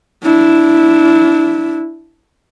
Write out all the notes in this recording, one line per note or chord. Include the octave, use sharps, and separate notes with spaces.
D4 E4